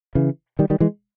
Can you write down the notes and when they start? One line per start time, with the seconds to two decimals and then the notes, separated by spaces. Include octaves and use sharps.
0.15 C#3 E3
0.59 D#3 G3
0.70 D#3 G3
0.80 E3 G#3